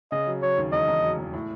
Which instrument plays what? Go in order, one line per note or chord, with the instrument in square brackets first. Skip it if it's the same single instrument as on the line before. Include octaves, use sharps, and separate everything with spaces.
[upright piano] C#3 [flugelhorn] D#5
[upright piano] F#3
[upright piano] F#3 [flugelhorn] C#5
[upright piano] D#2
[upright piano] E1 [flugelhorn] D#5
[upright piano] E1
F#3
E1
A2